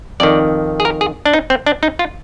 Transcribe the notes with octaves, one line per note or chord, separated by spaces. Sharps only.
F2 D#3 D5
G#4
A#4
G#4
D4
D#4
C4
D4
D#4
F4